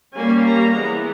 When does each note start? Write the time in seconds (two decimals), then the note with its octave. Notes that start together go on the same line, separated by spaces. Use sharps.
0.14 G3 A#3 C#4 G#5
0.44 A#5
0.74 E3 G#3 B3